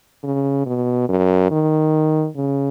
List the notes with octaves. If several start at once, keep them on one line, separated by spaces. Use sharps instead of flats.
C#3
B2
F#2
D#3
C#3